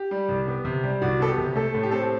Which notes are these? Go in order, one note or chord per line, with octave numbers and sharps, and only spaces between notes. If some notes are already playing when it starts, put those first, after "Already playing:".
Already playing: G4
G3
C2
B3
C3
G3
C2 F#4
B3 A4
G4
C3
A3 A4
A2
G4
C4 A4
G4